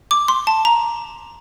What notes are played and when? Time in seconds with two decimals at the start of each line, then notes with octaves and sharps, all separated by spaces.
0.11 D6
0.28 C6
0.47 A5
0.65 A#5